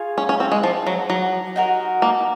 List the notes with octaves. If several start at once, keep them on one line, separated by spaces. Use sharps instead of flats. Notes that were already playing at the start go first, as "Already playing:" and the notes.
Already playing: F4 G#4 C#5 F5
C#4
C#4
C4
G#3
F3
F#3
F#3
D#4 F#4 A#4
A#3